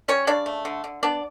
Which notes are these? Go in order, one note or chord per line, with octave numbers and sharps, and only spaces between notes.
G3 C#4 C#5
C#3 D4 D5
A3
D3
D3
B3 D4 D5